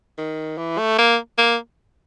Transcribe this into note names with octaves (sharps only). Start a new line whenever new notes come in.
D#3
E3
A3
A#3
A#3